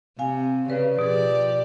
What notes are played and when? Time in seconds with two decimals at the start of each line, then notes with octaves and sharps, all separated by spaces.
0.19 C3 F5 G#5
0.69 C#3 B4 D5
0.99 B2 F3 G4 G#4 D5